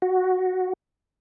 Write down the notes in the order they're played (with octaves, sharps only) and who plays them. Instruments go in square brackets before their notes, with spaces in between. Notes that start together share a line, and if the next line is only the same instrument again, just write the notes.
[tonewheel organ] F#4